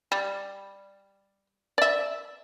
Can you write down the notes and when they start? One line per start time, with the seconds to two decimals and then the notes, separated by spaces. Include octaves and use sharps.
0.12 G3
1.78 D5 E5